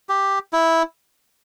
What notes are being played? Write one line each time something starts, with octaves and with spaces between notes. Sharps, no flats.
G4
E4